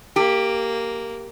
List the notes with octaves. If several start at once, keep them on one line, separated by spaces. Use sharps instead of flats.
A#3 G4